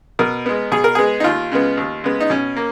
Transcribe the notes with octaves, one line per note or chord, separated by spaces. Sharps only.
B2 A#4
G#3 B3
B2 G#4
A#4
G#3 B3 G#4
D#4
D#2 F4
C#3 G#3 B3
D#2
C#3 G#3 B3
D#4
B2 C#4
A#3